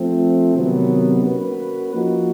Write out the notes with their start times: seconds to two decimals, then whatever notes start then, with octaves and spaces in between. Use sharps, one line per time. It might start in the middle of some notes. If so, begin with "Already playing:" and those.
Already playing: F3 A3 C4
0.54 C3 D#3 F#3 B3
1.24 A#3 C#4 F#4 B4
1.94 F3 A#3 D#4 F#4